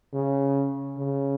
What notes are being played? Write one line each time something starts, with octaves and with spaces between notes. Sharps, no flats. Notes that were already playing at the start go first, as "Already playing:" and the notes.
C#3
C#3